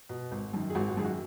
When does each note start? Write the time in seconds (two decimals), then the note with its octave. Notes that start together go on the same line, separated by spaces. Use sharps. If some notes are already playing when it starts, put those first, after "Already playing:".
0.09 B2
0.31 G#1
0.53 F#2 D#3
0.70 G#4
0.75 G#1 F#4
0.89 F#4
0.97 F#2 D#3 G#4
1.05 F#4